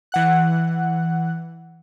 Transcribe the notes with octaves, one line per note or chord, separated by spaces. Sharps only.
E3 F#5 F#6